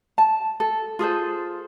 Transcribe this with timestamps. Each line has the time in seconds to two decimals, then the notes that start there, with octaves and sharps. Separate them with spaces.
0.18 A5
0.60 A4
0.99 F4 G#4 A4 C5